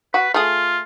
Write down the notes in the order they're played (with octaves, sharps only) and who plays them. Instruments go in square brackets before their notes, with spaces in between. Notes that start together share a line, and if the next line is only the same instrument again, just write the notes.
[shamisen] F#4 [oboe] B4
[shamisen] A3 G#4 [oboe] F4